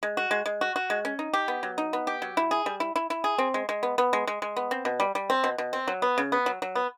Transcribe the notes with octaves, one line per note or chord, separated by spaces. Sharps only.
G#3
F#4
G#3
G#3
F#4
F#4
G#3
C#4
D#4
G4
B3
F#3
D#4
B3
G4
F#3
E4
G#4
G3
E4
E4
E4
G#4
C4
G#3
G#3
B3
B3
G#3
G#3
G#3
B3
C4
B2
G3
G3
C4
B2
B2
C4
F#3
B3
C#3
B3
F#3
F#3
B3